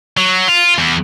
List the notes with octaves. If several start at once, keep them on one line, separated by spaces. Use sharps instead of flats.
F#3
F4
E2